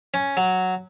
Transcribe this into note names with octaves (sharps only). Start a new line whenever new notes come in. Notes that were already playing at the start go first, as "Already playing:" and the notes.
C#4
F#3